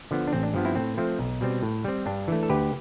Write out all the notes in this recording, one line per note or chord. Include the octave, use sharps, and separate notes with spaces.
D3 F3 B3
D4
A1 C4
D4
G2 F3 B3
C4 E4
A2 C4
F3 A3 C4
B1
B2 G3 C4
A2
G3 C4
G2 D4
E3 A3
A4
D2 G4 B4